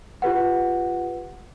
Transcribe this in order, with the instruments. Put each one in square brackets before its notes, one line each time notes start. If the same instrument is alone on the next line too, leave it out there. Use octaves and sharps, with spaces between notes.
[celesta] F4 G4 B4 F#5